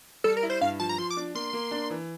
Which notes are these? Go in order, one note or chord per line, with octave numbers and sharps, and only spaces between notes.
G3 A4
A#4
E4
C5
G2 F5
F3 A5
A#5
F3 C6
D6
D4
A#3 C6
A#3
D4
E3